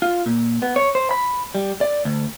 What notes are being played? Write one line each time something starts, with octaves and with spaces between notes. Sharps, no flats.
F4
A#2
B3
C#5
C5
B5
G3
D5
D2